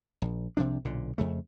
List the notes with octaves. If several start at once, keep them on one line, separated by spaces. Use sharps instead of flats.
A#1
C2 C3 F3 D4
B1 A#2 D3
F2 C#3 A3